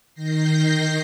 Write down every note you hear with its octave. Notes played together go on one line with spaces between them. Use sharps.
D#3 G6 A#6 C7